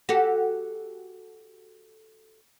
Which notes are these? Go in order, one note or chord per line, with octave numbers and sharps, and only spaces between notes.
F#4 G4 A4